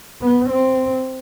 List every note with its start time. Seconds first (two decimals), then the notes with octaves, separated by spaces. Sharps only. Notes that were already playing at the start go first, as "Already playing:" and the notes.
0.21 B3
0.49 C4